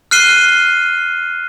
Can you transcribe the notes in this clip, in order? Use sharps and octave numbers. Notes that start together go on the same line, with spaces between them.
F6 F#6 C7 D#7 G7